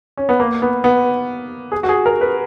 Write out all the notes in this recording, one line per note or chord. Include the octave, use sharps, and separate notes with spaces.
C#4
B3
A#3
B3
B3
G#4
F#4
G#4
A#4
B4